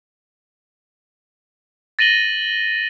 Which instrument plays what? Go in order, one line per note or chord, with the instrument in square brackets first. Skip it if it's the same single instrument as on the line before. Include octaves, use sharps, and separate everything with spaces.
[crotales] A6 A#6 D#7 F#7 G7